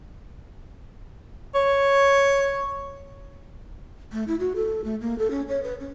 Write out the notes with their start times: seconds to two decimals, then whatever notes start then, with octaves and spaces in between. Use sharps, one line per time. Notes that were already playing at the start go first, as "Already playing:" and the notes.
1.55 C#5
4.12 A3
4.28 E4
4.40 F#4
4.56 A4
4.84 A3
5.01 A#3
5.18 A4
5.31 C#4
5.49 C#5
5.63 B4
5.80 C#4